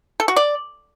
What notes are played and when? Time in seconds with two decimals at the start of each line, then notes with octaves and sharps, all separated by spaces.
0.20 A4
0.28 F#4
0.36 D5